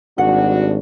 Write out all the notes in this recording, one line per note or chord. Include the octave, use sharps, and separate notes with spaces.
G#1 G3 D4 F#4 F#5